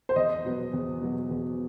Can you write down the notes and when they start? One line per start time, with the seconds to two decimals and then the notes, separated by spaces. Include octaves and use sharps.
0.09 C5
0.16 E2 D#5
0.45 B2 F#3 B3
0.73 E2
1.01 B2 F#3 B3
1.31 E2